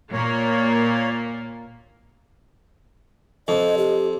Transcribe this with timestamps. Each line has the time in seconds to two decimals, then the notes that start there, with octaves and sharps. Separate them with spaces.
0.13 A#2 A#3 C#5
3.48 F2 D#5
3.78 G4